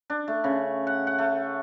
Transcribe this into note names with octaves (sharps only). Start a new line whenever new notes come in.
D4
A3
C#3
F#5
F#5
A3